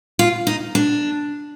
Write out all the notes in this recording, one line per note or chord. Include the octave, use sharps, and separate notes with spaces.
F4
D#4
D4